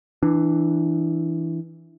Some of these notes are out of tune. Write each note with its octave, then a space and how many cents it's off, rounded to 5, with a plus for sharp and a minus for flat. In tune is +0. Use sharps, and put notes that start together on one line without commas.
E3 +0 D4 +20